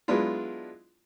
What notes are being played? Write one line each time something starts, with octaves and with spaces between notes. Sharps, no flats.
F#3 G#3 B3 D4 E4 F4